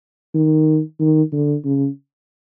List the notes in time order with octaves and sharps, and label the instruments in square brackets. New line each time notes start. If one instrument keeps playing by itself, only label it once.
[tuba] D#3
D#3
D3
C#3